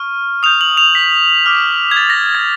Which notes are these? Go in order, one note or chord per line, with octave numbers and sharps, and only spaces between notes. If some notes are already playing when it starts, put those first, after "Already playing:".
Already playing: C#6 F6
D#6 G6 F7
F#7
F7
B6
D6 F6
G#6
A6
A#6
G#6